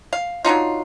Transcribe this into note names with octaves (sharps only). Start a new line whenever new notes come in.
F5
F#3 D4 D#4 F4